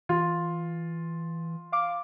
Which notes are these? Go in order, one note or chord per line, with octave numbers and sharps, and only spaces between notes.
E3 F4
F5 D6